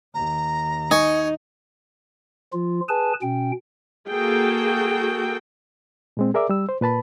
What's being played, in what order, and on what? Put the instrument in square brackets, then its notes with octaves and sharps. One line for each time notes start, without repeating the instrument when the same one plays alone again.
[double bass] D#2 [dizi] A#5
[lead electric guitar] D#4 [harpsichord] D#5 G#5 C#6
[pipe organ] F3 F4
G#4 B4 G#5 A5
B2 C#4 G5
[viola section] A#3 F#4 G#4 A4 G5
[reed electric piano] A#2 G#3 C4
G#4 A#4 D5 E5 D6
G3 E6
C5
A#2 B4 A5 B5